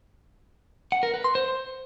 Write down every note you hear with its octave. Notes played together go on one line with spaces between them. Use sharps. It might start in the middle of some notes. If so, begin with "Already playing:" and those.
F#5
A#4
B4
C6
C5